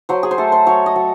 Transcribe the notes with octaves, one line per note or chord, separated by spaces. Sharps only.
F#3 C5
G#4
C5
A3 A4
C5
F#3 C#5
D#5
F#3